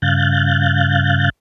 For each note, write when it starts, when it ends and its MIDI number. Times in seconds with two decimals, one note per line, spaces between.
0.02 1.30 43
0.02 1.30 49
0.02 1.30 77
0.02 1.30 90
0.02 1.30 91
0.02 1.30 93